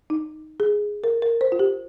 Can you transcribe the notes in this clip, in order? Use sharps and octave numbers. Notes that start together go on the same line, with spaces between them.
D#4
G#4
A#4
A#4
C5
F4
G4